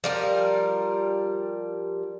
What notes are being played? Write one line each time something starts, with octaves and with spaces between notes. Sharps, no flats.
F3 G3 A#4